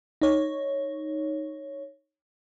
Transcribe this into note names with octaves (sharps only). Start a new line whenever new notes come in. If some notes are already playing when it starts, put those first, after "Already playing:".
D#4 C#5